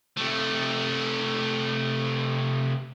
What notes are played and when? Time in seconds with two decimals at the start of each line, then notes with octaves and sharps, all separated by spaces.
0.17 C3 A3